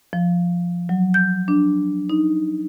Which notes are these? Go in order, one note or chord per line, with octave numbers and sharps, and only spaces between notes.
F3
F#3
G6
D4
D#4